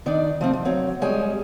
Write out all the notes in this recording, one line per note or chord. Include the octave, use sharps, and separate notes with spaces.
D#3 D4 D#4 D5
F3 A3 C4
F3
F#3 C4 C#5
G3 G#3 G#4 C#5 G5 G#5